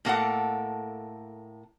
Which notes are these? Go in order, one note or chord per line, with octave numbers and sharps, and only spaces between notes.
A2 A#3 A4 F#5